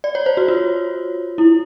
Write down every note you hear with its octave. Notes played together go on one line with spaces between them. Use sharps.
D5
C#5
C5
F#4
F4
E4